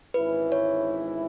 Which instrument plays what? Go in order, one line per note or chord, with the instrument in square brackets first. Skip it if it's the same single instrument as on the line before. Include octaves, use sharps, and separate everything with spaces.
[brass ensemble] G#1 G#2 E3 C#4 E4 [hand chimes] B4
[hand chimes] C#5